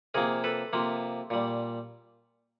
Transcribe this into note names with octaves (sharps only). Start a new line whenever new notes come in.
C3 F3 A#3 G#4 A#4
A4 B4
C3 F3 A#3
A#2 G3